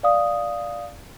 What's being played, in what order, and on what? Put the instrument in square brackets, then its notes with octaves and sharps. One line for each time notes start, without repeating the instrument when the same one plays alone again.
[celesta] D5 F5 D#6